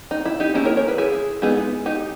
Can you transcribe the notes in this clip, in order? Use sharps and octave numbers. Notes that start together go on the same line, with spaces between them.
D#4
E4
D#4 G4
D#3 A#3 C#4 E4 G#4
A#4 C#5
A#4 C#5
G#4 B4
E4 G#4
G#3 B3 D#4 E4 G#4
D#4 G4